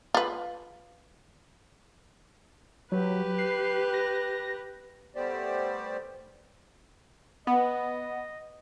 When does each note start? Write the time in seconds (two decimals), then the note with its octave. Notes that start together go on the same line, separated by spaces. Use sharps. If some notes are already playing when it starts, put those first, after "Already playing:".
0.14 F4 B4
2.92 F#3 G4 B4
3.38 C7
3.93 A#6
5.16 G3 A3 B3 G4 C5 D5
7.47 B3 D#5